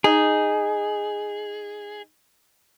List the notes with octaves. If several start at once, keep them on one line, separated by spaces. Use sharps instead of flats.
D#4 G#4